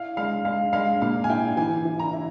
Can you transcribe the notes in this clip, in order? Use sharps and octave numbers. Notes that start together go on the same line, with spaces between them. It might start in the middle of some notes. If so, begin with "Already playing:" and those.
Already playing: E4 F5
G#3 F5
G#3 F5
G#3 F5
A#2 F5
G#5
E4 G5
E3 G#5
E3
A#5
E4